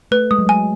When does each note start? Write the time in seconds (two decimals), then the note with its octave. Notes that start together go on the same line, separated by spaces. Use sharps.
0.11 A3 B4
0.31 G#3 D#6
0.39 F#3
0.47 G#3 G#5